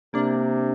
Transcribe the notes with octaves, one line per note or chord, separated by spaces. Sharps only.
C3 A#3 D4